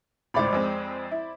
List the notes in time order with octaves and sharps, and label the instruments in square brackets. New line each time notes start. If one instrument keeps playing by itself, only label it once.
[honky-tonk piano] G#1 C#2 A2 [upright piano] C5 D5 B5
[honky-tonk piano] F2 G#3 C4
E4